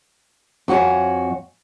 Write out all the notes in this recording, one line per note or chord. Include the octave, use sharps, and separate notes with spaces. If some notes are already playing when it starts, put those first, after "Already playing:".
F2 F#4 G4 C#5 G#5